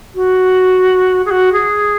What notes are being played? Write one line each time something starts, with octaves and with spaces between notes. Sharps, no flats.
F#4
G#4
F#4
G#4